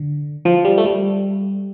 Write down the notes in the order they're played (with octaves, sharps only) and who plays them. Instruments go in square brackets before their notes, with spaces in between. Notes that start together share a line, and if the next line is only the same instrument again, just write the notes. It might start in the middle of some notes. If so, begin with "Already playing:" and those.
Already playing: [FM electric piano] D3
F3
G3
A3
G3